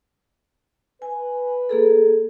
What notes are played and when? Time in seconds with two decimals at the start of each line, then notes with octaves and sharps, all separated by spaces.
1.02 B4 G#5
1.69 A#3 G#4 A4